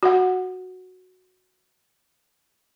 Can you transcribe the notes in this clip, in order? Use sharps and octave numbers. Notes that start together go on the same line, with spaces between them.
F#4 F#5